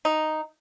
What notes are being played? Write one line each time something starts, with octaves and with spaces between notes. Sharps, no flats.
D#4